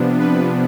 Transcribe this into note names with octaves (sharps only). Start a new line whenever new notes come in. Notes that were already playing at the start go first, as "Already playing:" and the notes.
Already playing: C3 F3 B3 D4
B4